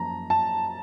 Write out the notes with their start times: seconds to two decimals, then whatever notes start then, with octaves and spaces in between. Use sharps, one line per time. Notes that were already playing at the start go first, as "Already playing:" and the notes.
Already playing: F#2 F3 A#3 A5 A#5
0.30 A5